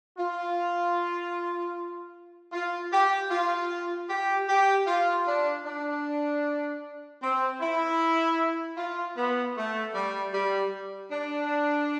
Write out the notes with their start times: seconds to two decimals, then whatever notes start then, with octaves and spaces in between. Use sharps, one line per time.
0.18 F4
2.53 F4
2.92 G4
3.31 F4
4.10 G4
4.49 G4
4.87 F4
5.27 D4
5.66 D4
7.22 C4
7.61 E4
8.77 F4
9.17 B3
9.56 A3
9.94 G3
10.34 G3
11.12 D4